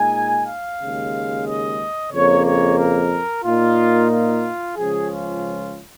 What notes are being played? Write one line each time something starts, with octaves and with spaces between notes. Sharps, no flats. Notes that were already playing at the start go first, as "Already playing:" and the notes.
Already playing: A#2 G#3 D#4 G#5
F5
D#2 C#3 G#3
D#5
F2 C#3 A#3 C#5
C#5
A#4
A#2 A#3 D#4 F4
F4
C#2 C#3 F3 C#4 G#4
F4